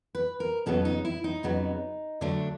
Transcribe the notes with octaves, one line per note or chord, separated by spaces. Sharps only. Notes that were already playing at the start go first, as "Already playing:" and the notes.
B4
A#4
F2 C#3 F#3 B3 A4
D#4
E4
D#4
F2 C#3 F#3 B3
D2 D3 F#3 A3 D4